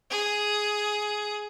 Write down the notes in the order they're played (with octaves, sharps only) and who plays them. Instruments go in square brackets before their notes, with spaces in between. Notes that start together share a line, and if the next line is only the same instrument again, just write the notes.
[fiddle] G#4